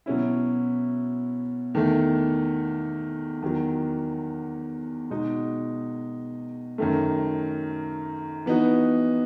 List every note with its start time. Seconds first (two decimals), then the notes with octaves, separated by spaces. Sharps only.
0.06 B2 F#3 C#4 E4
1.74 E2 D#3 A3
3.42 E2 D#3 F#3
5.10 B2 G#3 D#4 F#4
6.78 F#2 D#3 A3
8.46 E3 B3 D#4 F#4